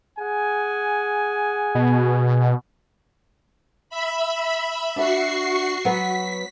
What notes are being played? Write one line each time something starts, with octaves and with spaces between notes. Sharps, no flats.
G#4 F#5 G#5
B2
E5 B5
D4 F#4 E5 C#6 C7
F#3 B3 B6